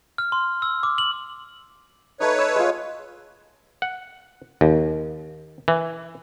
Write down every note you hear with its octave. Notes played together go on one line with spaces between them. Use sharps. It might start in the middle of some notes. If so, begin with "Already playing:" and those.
F6
C6
E6
D6
F#7
A3 D#4 B4 C#5
E6
G#3 F4
F#5
D#2
E3